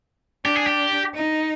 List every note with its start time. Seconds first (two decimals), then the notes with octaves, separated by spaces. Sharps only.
0.45 D4 G4
0.56 G#4
0.67 G4
1.14 D#4